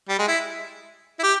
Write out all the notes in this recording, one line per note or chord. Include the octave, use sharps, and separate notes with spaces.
G3
G#3
E4
E4
G4